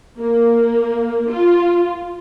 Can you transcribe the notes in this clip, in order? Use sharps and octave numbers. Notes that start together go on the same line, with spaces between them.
A#3
F4